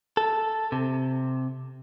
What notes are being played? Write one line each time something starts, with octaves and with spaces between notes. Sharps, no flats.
A4
C3